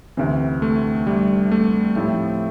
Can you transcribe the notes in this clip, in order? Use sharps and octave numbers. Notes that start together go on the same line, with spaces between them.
D2 C3 E3 C4
A3
G3
A3
A2 F3 A3 C4 E4 G4